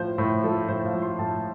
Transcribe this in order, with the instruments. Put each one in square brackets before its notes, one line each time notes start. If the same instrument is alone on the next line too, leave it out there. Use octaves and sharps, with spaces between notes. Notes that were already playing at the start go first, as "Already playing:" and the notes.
Already playing: [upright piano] A2 F3 C5
A2 C5
F3 A4
A2 C5
F5
F3
C6
A2 A5